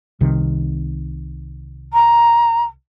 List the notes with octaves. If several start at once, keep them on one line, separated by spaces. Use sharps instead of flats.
C2 C3 D#3
A#5